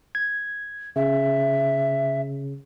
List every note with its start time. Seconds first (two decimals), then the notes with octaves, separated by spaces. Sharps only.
0.15 G#6
0.96 C#3 E5